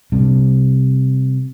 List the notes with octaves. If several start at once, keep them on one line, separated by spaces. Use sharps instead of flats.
C3 G3 D4